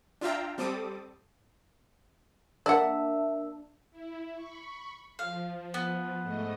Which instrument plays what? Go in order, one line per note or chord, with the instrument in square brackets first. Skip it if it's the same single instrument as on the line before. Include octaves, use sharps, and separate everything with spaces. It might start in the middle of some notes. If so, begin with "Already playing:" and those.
[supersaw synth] D4 F4 E5 F5 G5 A#5
G3 C4 A4 D6 D#6
[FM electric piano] A#3 E5 [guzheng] D4 [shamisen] D5 F#5
[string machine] E4
B5 C#6
[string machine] F3 [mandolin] F5
[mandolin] B3
[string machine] G#2 A3 D#5